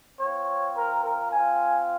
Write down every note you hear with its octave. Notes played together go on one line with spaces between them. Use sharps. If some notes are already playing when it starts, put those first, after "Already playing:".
C4 F4 C#5
A#4
A#4
C4 F4 G#5